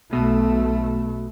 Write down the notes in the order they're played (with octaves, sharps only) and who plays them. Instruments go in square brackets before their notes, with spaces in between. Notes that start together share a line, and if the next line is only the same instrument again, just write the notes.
[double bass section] B1 A3 [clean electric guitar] B2